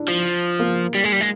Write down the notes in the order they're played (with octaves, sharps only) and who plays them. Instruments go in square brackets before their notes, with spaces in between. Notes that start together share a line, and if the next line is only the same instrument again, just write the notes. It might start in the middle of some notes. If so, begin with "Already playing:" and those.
Already playing: [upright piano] D4 E4
[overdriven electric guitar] F3
[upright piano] A#3
[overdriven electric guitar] G3
G#3
G3
G#3